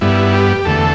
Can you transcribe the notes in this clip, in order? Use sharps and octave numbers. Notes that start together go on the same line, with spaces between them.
G2 G3 B3 E4
G4
E2 D3 A3 A4